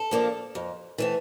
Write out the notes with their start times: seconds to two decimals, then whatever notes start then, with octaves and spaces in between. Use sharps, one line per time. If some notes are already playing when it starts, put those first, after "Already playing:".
Already playing: A4
0.11 F3 A#3 D4
0.55 F2
0.98 E3 A3 C4